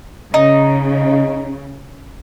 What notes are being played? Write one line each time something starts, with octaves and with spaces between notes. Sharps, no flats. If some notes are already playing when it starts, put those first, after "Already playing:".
C#3 D#4